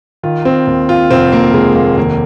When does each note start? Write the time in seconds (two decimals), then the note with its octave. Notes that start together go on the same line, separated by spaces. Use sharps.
0.23 D#3 F4
0.45 C4
0.67 D#2
0.89 F4
1.11 F1 C4
1.32 A#3
1.54 F1 G#3
1.75 A#3
1.97 D#2 A#3